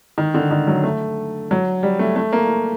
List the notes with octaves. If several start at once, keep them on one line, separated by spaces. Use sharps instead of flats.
D#3
D3
D#3
F#3
A3
F#3
G3
A3
A3
A#3